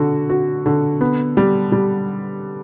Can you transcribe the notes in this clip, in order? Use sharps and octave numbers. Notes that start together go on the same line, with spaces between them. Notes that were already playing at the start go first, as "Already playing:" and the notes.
Already playing: D3 F#4
F#4
D3
B3
G3
G3